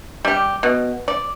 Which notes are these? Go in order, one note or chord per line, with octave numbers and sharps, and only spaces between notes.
G3 G4
B2
D5